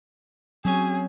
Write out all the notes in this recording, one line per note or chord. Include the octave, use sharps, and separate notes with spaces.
F#3 C4 C#4 G#4 C#5